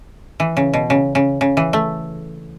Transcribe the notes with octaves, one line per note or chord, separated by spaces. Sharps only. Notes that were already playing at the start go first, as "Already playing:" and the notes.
E3
C#3
B2
C#3
C#3
C#3
E3
A3